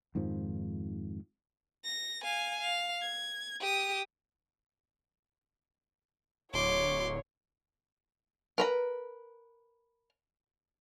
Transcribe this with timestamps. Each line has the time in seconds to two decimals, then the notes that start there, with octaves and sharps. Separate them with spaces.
0.15 F2 G#2 D#3 F3
1.85 A#6
2.23 F5 G#5
2.61 F5
3.01 G#6
3.60 G4 D#6
6.54 D1 C#5 C6 D6
8.58 A#4 B4 A#5